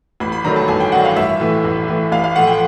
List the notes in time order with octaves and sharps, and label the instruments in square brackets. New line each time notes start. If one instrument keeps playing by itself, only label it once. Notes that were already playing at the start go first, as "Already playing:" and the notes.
[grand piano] A1 B5
B5
G2 D#3 F#3 A3 A#5
A5
A1 G#5
G5
G2 D#3 F#3 A3 F#5
F5
A1 E5
A2 E3
A1
A2 E3
A1 F5
F5
A2 F3 A3 F#5
G5